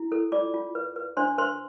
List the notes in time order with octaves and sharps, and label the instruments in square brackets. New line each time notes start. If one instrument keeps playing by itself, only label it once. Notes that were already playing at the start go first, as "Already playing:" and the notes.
Already playing: [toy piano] E4
A4
F4 D5 D6
F4
B4
B4
D4 C5 C6
B4 C5 C6